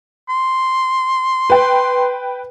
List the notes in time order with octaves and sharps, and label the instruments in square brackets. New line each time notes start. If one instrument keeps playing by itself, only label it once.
[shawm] C6
[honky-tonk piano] B4 G5